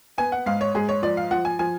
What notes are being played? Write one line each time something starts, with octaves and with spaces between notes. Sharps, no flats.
B3 G#5
F#5
G#2 F5
C#5
G#2 G#4
C#5
F3 D5
F5
F3 F#5
G#5
F3 G#5